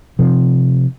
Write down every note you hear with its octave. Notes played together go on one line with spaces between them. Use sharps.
C3 F3